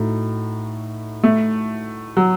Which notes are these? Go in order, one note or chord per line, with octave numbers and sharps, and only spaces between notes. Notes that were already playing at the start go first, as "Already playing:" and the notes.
Already playing: A2 D#4 F#4
A3
F#3